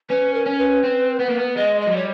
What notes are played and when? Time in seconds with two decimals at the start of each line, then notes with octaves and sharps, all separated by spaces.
0.09 C#4 B4
0.34 A#4
0.46 C#4
0.59 B4
0.83 C4
1.20 B3
1.28 A#3
1.36 B3
1.56 G#3 D#5
1.81 D#5
1.87 F#3
1.93 G3 C#5